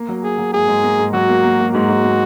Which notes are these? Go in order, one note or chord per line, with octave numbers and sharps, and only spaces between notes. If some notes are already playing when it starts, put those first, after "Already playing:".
Already playing: A#3
F#3
A#3 G#4
F#3
G#2 G#4
G#2
A#3
G#2
F#3 F#4
A#3
A#3
A#3
G#2 F#4
G#2
A#3